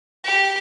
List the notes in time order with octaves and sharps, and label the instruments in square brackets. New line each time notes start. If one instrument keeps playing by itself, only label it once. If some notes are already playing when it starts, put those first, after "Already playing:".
[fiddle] G4